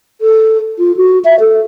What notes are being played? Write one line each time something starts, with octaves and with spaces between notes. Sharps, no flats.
A4
F4
F#4
E5
A4